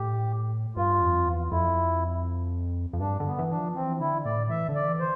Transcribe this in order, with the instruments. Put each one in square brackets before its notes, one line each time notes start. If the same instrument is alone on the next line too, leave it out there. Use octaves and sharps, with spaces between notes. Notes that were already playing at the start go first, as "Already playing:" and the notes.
Already playing: [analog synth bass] A2 [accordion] G4
[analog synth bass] G2 [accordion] F4
[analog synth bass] F2
E2
[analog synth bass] F2 [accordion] E4
[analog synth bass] F2
[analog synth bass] G2 [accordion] D4
[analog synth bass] D3
[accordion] B3
[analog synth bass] E3
[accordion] D4
[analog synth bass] F3
[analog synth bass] E3 [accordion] C4
[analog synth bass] D3 [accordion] E4
[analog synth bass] A2 [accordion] D5
[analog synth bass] E3 [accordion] E5
[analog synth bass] D3
[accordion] D5
[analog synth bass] E3
[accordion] C5